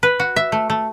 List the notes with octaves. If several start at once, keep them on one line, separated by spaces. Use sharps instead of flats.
B4
F#4
E5
A3
A3